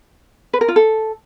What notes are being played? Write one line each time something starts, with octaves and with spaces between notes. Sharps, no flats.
B4
A#4
F4
A4